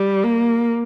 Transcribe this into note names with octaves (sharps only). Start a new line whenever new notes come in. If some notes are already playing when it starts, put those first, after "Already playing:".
Already playing: G3
A#3